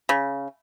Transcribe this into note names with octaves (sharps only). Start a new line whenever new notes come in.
C#3